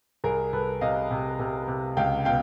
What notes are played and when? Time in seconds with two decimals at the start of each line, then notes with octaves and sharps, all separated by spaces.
0.24 C2 G#4 A#4
0.53 C2 A4 B4
0.81 C3 D#5 F5
1.11 C3
1.39 C3
1.68 C3
1.97 C#2 F5 G5
2.25 B2 F5 G5